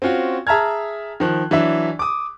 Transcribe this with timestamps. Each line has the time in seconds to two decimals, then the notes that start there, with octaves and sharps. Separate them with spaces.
0.02 C4 C#4 F4 F#4
0.47 G#4 E5 A5 A#5 F6 G#6
1.20 D#3 F3 F#6
1.51 E3 F#3 D4 D5 E5
1.99 D6 D#6